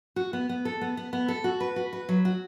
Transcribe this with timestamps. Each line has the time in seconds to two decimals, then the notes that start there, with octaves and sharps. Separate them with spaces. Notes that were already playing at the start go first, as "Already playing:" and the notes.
0.16 F#4
0.33 B3
0.49 B3
0.65 A4
0.81 B3
0.97 B3
1.13 B3
1.28 A4
1.44 F#4
1.60 B4
1.76 F#4
1.93 B4
2.09 F#3
2.25 F#4